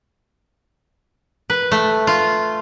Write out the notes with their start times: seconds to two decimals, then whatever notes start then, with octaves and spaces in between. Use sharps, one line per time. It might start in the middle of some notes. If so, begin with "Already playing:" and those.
1.50 B4
1.72 A3
2.07 F4